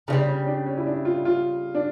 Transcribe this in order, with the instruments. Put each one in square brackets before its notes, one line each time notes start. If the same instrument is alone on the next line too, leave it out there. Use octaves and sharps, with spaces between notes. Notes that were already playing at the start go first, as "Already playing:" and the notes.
[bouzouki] C#3 E3 [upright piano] D4
[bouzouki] G3
[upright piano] C#4
D4
C#4
E4
D4
F4
F4
D4